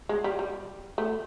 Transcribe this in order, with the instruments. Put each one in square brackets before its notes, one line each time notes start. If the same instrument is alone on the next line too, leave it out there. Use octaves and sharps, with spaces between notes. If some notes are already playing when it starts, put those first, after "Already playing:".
[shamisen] G#3
G3
G3
A3